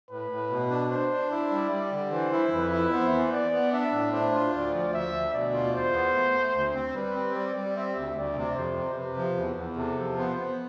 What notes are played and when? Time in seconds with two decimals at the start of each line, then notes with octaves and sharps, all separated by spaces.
0.10 A2 B4
0.30 A2
0.50 B2
0.70 D4
0.91 D4 C5
1.11 D4
1.31 E4 D5
1.51 G3
1.72 G3
1.91 D3
2.11 E3 C5
2.32 E4
2.52 F2 B4
2.72 E4
2.92 B3 C5
3.13 E3
3.32 B3 D5
3.52 B3
3.72 D4 E5
3.92 A2
4.13 D4 C5
4.33 F4
4.53 D2 D5
4.73 F3
4.94 D2 E5
5.14 D2
5.34 B2 D5
5.53 F4
5.74 E2 C5
5.94 B3
6.14 A3
6.34 A3
6.54 D2
6.74 C4
6.95 G3 B4
7.15 C4
7.35 G3 D5
7.56 G3
7.76 C4 E5
7.96 D2
8.15 D2 D5
8.36 C3
8.55 F2 C5
8.76 C3
8.96 C3 B4
9.17 F3
9.36 E2
9.56 E2
9.76 C3 A4
9.97 F3
10.17 B3 C5
10.37 B3